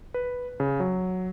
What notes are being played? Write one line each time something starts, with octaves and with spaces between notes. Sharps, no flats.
B4
C#3
F#3